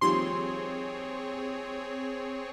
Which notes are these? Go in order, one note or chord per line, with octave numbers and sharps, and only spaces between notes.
D#2 F3 G3 C4 G#4 C#5 C6